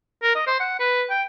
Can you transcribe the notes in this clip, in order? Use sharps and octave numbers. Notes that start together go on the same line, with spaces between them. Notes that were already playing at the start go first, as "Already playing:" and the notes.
A#4
D#5
C5
F#5
B4
G5